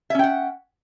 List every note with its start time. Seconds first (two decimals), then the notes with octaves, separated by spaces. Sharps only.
0.10 E5
0.15 C#4
0.19 G5
0.24 F#5